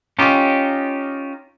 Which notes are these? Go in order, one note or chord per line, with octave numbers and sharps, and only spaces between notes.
C#4 D#4 F4 G4